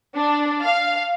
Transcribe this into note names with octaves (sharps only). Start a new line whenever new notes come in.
D4
F5